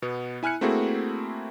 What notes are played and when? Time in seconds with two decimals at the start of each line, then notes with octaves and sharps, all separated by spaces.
0.02 B2 B3
0.43 E4 G#5 F6 F#6 C#7
0.61 A3 A#3 C4 E4 F#4 G#4